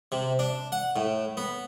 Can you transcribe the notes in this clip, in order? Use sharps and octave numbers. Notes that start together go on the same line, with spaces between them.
C3
D4
F#5
A2
B3